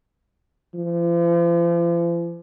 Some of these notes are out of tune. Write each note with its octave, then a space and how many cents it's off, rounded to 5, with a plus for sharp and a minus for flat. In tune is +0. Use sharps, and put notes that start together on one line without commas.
F3 -40